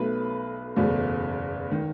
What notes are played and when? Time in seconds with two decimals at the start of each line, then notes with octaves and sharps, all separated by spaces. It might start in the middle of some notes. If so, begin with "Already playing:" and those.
Already playing: B1 B2 F#3 A3 B4
0.76 F#1 E2 B2 F#3 A3
1.71 D#3